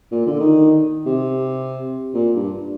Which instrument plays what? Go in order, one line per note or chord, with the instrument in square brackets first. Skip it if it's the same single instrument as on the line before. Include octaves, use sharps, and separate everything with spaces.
[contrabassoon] A#2
D3
D#3
C3
A#2
G2